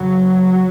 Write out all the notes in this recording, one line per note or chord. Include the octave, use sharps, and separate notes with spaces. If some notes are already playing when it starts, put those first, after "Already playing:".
Already playing: F#2 C#3 F#3